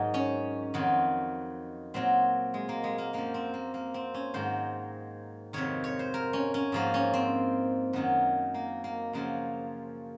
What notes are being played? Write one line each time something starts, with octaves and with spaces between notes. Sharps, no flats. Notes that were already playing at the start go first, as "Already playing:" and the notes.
Already playing: G#2 D#3 F#3 D#4
C#4
F2 D#3 F#3
A#2 F#3 C4
G#3
A#3
G#3
A#3
F#2 F3 A#3
C4
A#3
A#3
C4
C#4
G#2 D#3 F#3 C5
F2 C3 D#3 C#5
C#5
C5
A#4
C#4
C#4
G#2 F3 A#3
C#4
C4
F#2 D#3 F#3
A#3
A#3
F#2 C#3 F3 A#3